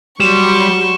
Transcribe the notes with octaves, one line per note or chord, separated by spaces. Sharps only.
F#3 G3 C6 C#6 E7